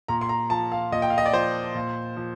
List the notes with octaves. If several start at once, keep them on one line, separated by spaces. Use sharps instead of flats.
A#2 A#5
C6
A#5
F3 A5
F5
A#2 D#5
G5
F5
D#5
D5
F3 C5
A#2
F3